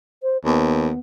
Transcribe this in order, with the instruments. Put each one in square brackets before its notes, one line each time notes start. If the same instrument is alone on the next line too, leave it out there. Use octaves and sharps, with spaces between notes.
[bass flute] C5
[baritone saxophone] D#2 [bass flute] B3